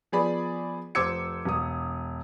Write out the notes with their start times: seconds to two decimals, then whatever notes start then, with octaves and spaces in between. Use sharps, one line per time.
0.12 F3 B3 G#4 D5 B5
0.95 F1 C5 D6 E6 G#6 C#7
1.45 E1 D#6